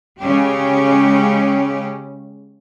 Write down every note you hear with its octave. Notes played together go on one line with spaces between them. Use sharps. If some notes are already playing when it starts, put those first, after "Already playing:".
C#3 G#3 C#4 G4